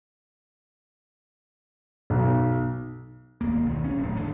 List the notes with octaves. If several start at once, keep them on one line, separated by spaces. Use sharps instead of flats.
B1
D#1 G#1 D#2 A#3
B1 D#3
C3 A#3 C#4
D#1 A#1 F#2 A2
G#1 D3